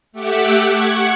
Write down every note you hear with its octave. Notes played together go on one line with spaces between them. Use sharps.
A3 G4 E5 F#5 D6
F#5 C#6 G#6